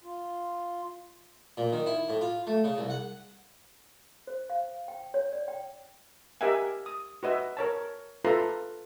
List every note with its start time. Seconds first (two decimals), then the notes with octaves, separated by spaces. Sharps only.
0.04 F4
1.57 A#2
1.72 D#3
1.86 E4
2.09 A2
2.21 F4
2.47 A3
2.64 C#3
2.78 C2
2.90 F#5
4.27 C5
4.50 F5
4.88 G5
5.14 C#5
5.33 D5
5.48 G5
6.41 G4 A#4 D#5 E5 F#5 G#5
6.86 D#6
7.23 F#4 B4 D#5 E5
7.57 A#4 C#5 A5
8.25 F4 A4 B4 E5 A#5 C6